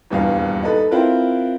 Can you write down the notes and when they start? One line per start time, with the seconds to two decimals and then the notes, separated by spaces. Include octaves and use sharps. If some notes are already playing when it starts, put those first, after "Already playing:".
0.10 D#1 E2 G2 F5
0.63 D#4 A4 B4
0.91 C4 E4 F4 A#4 B4